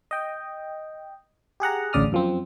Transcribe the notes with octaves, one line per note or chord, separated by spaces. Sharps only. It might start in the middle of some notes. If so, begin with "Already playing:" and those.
D#5 G5
G4 G#4 F#5 A#5
A1 D2 C#3 D5 D#6 F6
F#2 F3 C4